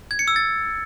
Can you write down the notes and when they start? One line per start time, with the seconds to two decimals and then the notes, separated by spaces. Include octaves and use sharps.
0.11 G#6
0.19 C#7
0.28 E6
0.36 A6